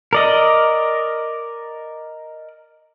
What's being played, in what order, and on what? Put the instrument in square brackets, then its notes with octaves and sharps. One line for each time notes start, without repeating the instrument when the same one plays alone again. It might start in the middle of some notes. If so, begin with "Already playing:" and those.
[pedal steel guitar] A#4 D5 D#5